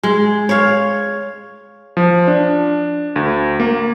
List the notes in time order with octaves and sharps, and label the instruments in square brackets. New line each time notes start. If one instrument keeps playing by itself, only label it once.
[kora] G#3
C#5 F5
[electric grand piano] F3
D4
D2
A#3